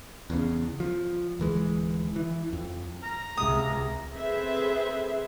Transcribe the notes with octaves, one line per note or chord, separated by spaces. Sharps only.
E2 C#3
F3
D1 E3 G#3
E3
F2
A#5
C#2 C3 D#6
C4 G#4 A4 B4 C5 E5